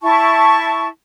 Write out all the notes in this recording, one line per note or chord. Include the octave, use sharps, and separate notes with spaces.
E4 A5 C#6